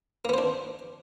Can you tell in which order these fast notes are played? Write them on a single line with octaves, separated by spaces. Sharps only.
A#3 B3 C5 D4